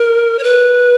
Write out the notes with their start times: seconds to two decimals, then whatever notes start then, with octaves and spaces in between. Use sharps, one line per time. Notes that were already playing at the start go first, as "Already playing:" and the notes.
Already playing: A#4
0.39 C#5
0.43 B4